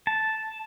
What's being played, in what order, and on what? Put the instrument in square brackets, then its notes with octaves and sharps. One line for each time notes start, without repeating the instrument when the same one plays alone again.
[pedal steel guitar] A5